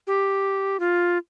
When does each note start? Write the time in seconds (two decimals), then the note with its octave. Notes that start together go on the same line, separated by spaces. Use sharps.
0.07 G4
0.80 F4